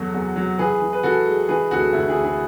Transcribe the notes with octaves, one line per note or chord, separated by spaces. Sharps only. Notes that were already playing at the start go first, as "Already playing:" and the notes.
Already playing: E2 F#3 F#4 A4
E2
F#3
E3 G#4 B4
E3
B4
E3 F#4 A4
G#3
E3 G#4 B4
D2 F#4 A4
D2 E4
E4 G#4
D2
E4 G#4